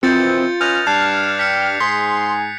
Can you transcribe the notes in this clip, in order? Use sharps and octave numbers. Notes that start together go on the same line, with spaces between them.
B2 D#3 E3 C4 F4 G6 A6 C#7
C#4 B4 D#5 F6 G6 F7
G2 G3 D4 A5 F#6 G#6 C7
G5 B6 C#7
G#2 G#4 C6 B6